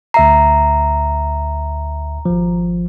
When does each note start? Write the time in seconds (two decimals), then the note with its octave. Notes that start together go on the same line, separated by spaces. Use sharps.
0.14 D2 E5 A#5 C7
2.25 G#1 F3